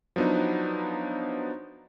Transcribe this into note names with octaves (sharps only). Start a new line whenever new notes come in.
F3 F#3 B3 D4 D#4